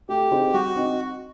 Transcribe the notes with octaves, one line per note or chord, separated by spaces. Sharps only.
A3 G4
C4 D#4 G#4 C5
G3 F#4
C4 D#4